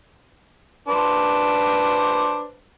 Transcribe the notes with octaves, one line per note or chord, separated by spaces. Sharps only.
D4 B4 C5